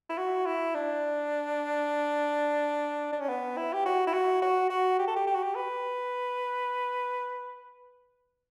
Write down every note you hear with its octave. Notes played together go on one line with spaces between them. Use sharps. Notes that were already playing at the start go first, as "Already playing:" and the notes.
E4
F#4
E4
D4
D4
C#4
B3
E4
G4
F#4
E4
F#4
F#4
F#4
G4
A4
G4
G4
F#4
G4
B4